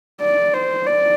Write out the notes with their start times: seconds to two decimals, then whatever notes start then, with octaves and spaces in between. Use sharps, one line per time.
0.21 D5
0.54 C5
0.86 D5